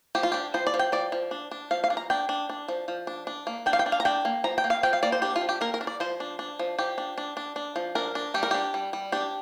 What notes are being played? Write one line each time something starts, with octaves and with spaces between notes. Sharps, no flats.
F3 G4
F4
D4 G4
F3 C5
D5
F3
G5
F3 D5
F3
D4
D4
F3 F5
F5
D4
A#5
D4 G5
D4
D4
F3
F3
D4
D4
A#3
D4 G5
F5
G5
D4
F5
A#5
D4 G5
A#3
F3 A#5
G5
A#3
F5
F3 G5
F5
A#3 D5
C5
D4 G4
F4
F3
G4
A#3 A#4
A#4
D4
D5
F3 C5
D4
D4
F3
F3 G4
D4
D4
D4
D4
F3
D4 A#4
D4
G3 G4
A#4
D4 G4
G3
G3
D4 G4